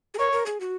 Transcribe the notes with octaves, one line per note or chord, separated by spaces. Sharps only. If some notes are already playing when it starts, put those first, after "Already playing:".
G#4
A#4 C#5
A#4
G#4
F#4